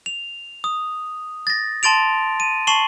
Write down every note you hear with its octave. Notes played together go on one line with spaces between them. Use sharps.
F7
D#6
A6 A#6
A5 C6 A6 D7 F7
D#7
A5 C#6 C7 E7 F#7 G7